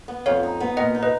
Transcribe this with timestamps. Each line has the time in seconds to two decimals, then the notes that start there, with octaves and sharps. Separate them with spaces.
0.08 B3
0.26 F2 C#5 F5
0.43 D#4
0.60 B3
0.77 A#2 D#5 F#5
0.95 D#4
1.03 B4 D#5